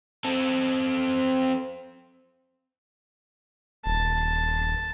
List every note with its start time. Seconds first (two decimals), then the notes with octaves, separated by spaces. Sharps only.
0.24 C4 A4
3.86 D#1 A5